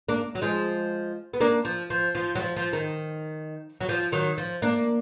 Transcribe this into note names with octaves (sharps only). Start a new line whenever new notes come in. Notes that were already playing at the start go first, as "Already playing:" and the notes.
A#3 D4
F#3
F3 G#3
B3
A#3 D4
F3
F3
F3
F#3
F3
F3
D#3
F#3
F3
D#3 F#3
F3
A#3 D4